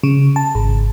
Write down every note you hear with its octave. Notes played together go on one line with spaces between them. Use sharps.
C#3
A5
G#1